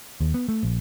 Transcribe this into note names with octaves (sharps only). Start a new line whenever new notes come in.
D#2
B3
A3
A#1